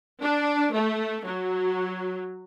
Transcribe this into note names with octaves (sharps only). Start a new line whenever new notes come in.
D4
A3
F#3